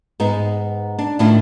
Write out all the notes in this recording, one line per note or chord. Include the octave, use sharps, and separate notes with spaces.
G#2 B3 D#4
D4
A2 D#3 D4 E4 F4